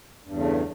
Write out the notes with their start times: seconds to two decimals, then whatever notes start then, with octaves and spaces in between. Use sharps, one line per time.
0.24 G2
0.28 E2
0.32 C#3
0.37 A3